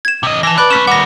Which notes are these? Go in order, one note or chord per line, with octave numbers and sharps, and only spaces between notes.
G#6 E7
C3 D#5
E3 A5 A#6
B4 D5 B5 F#6
A3 C#4 B6 E7
D#3 G3 F#5 A#6